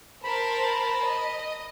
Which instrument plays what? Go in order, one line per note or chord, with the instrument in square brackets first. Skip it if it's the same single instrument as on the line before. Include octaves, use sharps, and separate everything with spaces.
[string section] A#4 C5 A5 [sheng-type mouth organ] B5
[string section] D#5